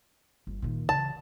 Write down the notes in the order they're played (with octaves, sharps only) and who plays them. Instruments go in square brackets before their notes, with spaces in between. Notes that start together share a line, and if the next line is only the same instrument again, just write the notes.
[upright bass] G1
A#2 D#3
[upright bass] C#3 E3 [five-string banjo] A5